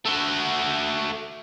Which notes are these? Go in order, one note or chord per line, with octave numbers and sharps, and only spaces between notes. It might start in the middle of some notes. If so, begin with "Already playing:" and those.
A3 F#4